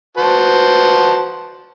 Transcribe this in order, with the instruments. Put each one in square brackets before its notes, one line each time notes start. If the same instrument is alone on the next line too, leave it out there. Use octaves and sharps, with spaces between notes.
[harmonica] F#4 C5 A5 [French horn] B4